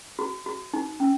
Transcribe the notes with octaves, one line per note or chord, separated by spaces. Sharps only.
F#4
F#4
D#4
C#4